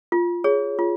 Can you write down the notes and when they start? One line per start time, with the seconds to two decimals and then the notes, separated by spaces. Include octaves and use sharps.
0.12 F4
0.44 G#4 C#5
0.79 F4